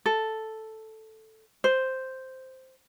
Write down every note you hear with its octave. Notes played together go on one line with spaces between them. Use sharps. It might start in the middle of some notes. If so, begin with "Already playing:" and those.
A4
C5